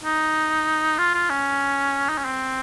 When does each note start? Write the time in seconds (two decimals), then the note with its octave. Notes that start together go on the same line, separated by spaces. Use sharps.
0.04 D#4
0.99 F4
1.14 F4
1.30 C#4
2.09 D#4
2.18 C#4
2.25 C4